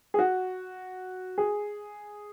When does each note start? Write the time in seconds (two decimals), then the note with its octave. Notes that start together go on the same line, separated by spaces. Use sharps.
0.14 G#4
0.19 F#4
1.38 G#4